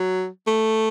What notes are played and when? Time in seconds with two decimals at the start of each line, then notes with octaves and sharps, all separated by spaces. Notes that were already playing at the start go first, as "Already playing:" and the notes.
Already playing: F#3
0.47 A3